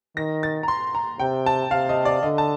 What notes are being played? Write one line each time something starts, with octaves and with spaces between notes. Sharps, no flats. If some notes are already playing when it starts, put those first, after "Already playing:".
D#3 A#6
A6
A#5
C6
A#5
C3 G5
A5
C3 F5
D#5
D5
D3 D#5
A5